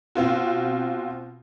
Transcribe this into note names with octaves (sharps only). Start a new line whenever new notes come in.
B2 C4 F4 F#4